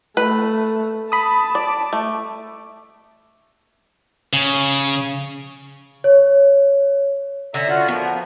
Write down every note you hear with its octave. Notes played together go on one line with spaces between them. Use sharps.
A3 B4
A5 B5 D#6
D5 D6
A3
C#3
C#5
D3 C#4 E5 A#5
F4 F#4
F3 B3 A#4